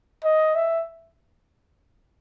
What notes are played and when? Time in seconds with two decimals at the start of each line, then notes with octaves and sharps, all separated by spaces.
0.24 D#5
0.56 E5